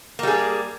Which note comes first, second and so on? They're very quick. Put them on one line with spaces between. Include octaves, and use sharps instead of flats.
A#3 G3 G#4